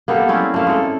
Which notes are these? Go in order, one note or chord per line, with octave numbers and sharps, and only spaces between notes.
A#3 B3 G4 A4
C4 C#4 E4 D5
A3 A#3
G#3 A4